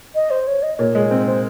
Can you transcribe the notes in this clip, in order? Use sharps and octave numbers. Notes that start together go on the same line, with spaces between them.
D#5
C5
C#5
D#5
A#2 C#5
G#3
C4 C5
C5